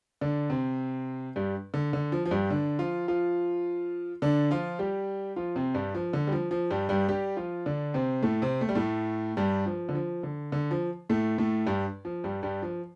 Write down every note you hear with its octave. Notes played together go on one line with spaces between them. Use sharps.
D3 D4
C3 C4
G2 G3
D3
D3
F3
F3
G2 G3
D3 D4
F3 F4
F3 F4
D3 D4
F3 F4
G3 G4
F3 F4
C3 C4
G2 G3
F3
D3
G3
F3
F3
G2 G3
G2 G3
G3 G4
F3 F4
D3 D4
C3 C4
A2 A3
C3 C4
A3
G3
A2 A3
G2 G3
F3
D3
F3
D3
D3
F3
A2 A3
A2 A3
G2 G3
F3
G2 G3
G2 G3
F3